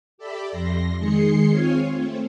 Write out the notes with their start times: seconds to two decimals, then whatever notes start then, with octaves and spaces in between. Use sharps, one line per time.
0.18 G4 A4 D5 E5 B5
0.50 F2 C6 A#6
0.99 D#3 G#3 G#4 C6 C7 C#7
1.49 C4 F4 C#5 F5 G#5
1.95 A3 C4